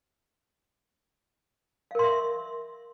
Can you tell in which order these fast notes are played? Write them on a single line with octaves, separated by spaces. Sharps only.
F5 A#4 C6 E5